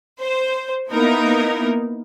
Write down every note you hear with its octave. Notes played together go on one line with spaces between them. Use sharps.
C5
A#3 B3 D#4 E4 A#4